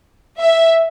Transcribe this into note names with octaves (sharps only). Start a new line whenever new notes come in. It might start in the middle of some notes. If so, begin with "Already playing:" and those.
E5